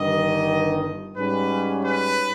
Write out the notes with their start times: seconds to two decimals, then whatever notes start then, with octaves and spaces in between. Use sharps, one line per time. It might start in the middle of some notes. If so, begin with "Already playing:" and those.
Already playing: G1 G2 D#3 D#5
1.16 G#2 G3 C#4 B4
1.84 B4